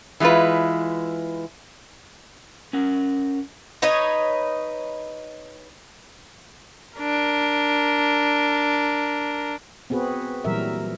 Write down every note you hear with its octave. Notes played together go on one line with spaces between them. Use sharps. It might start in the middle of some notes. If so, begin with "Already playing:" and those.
E3 G#3 E4 F4 B4
C#4 A#4 F#5
D#4 B4 C#5 D#5
D4 A#4
B3 C4 F#4 G#4 B4
A#2 E3 F#3 G3 A#4 E5